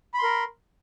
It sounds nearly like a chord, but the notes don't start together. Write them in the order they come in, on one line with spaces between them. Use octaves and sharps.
B5 C6 A#4